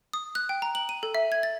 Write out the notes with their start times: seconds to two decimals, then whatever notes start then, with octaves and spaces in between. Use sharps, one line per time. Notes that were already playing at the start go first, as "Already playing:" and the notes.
0.13 D#6
0.35 F#6
0.49 G5
0.62 A#5
0.75 F#7
0.89 D#7
1.03 A4
1.15 E5
1.32 G#6
1.43 A6